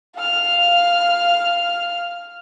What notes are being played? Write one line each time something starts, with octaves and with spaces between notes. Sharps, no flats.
F5 F6